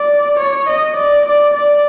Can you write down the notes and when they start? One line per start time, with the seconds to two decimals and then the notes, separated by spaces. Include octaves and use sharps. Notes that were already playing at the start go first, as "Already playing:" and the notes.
Already playing: D5
0.39 C#5
0.68 D#5
0.97 D5
1.25 D5
1.54 D5